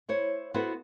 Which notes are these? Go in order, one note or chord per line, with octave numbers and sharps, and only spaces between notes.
E4 C5 C#5
B3 E4 F#4 A4 C5